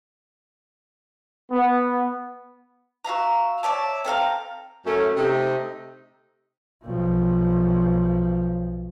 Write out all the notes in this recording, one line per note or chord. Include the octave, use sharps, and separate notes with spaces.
B3
F#4 E5 F5 A#5
C#5 D5 E5 A5
C4 A4 F5 A#5
F#2 A3 C#4
C3 A3 D#4
B1 F3